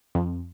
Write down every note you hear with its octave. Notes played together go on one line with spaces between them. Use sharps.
F2